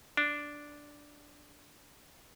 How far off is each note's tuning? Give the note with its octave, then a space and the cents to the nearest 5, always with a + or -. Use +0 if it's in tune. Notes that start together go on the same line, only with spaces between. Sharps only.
D4 -5